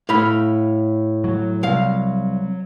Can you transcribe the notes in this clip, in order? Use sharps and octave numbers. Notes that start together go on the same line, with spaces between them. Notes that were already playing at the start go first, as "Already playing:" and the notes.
A2 F5 B5
F#3
C2 F5